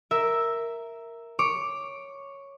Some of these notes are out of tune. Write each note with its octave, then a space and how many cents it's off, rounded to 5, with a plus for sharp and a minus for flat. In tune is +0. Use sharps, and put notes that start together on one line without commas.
A#4 +0 E5 +0
C#5 +0 D6 +0